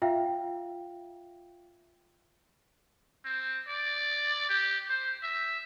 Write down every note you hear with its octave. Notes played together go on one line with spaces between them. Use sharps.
F4 E5 F5 G5
C4
D5
G4
C5
E5